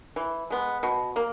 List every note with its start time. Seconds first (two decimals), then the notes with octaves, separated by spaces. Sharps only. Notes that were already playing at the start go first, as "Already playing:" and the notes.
0.16 E3
0.50 G#3 B3
0.83 B2
1.16 A#3